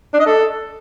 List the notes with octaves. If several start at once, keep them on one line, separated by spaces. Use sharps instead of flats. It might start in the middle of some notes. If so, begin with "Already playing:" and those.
D4
D#5
A4